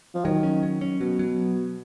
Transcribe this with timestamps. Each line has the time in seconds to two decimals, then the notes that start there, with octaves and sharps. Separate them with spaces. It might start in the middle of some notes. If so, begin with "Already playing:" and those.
0.14 F3
0.25 D#3 F#3
0.43 C#4
0.63 F#3
0.81 C#4
1.01 B2 F#3
1.19 F#3